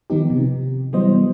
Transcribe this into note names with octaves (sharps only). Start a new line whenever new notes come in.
D#3 F3 B3 D#4 G4
C3
E3 F#3 G3 B3 C5 D#5